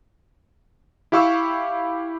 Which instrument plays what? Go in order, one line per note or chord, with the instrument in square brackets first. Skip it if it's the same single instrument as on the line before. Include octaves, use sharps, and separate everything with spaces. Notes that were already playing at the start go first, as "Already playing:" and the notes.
[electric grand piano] E4 G4 F5 C#6 E6